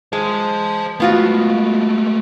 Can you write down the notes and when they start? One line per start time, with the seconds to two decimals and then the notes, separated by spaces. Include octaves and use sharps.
0.13 G#3 C5 A5
1.00 G#3 A3 B3 F4 F#4